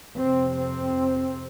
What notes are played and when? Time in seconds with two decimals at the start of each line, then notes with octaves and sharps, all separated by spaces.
0.17 F2 C3 C4
0.58 C4